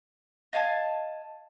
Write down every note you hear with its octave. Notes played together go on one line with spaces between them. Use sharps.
D#5 F5 G#5 A5